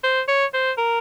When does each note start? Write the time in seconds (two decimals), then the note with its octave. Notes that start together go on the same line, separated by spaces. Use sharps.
0.04 C5
0.28 C#5
0.54 C5
0.78 A#4